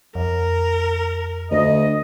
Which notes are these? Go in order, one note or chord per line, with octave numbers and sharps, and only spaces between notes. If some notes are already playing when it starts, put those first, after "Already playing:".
F2 A#4
D2 D#5